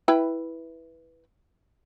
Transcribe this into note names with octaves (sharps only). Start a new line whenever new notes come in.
E4 B4 G5